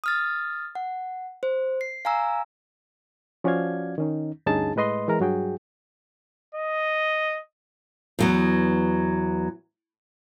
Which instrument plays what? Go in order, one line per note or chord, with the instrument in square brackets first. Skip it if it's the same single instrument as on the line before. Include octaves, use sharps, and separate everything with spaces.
[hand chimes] D#6 F6 A6
F#5
C5
C7
F5 G#5 A#5 E6
[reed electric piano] F3 C#4 F#4 D5 F5 G#6
D#3 C#4 D#4
D2 G2 C#4 D#4 G#4 A5
A2 G#3 B4 D#5 C6
E3 G#3 A#4 A#5
G2 F#3 F#4 G#4 G5
[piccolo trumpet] D#5
[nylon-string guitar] E2 F#3 B3